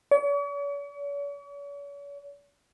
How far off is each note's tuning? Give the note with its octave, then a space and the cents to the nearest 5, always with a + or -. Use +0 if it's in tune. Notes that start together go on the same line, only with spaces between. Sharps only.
C#5 +45